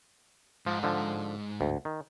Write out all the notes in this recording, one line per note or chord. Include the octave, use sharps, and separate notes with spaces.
G#2 F3
D3 F3
D2
D#3